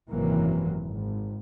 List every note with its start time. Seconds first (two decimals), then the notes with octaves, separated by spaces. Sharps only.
0.11 G#1 F#2 C3 E3 F#3 A#3
0.84 G#1